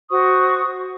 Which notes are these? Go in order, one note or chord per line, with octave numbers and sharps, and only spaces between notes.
F#4 C5 C#6 D#6